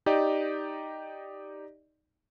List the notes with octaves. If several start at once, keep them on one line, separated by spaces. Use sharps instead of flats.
D#4 G4 D5 D#5